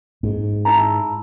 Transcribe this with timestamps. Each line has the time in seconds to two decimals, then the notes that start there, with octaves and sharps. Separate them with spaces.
0.23 G#2
0.65 E4 A5 A#5